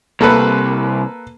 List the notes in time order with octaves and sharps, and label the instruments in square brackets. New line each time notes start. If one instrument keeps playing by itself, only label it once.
[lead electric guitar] C2 [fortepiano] A#3 A4 B4